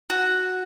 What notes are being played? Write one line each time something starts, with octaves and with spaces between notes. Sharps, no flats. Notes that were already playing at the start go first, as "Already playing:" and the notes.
F#4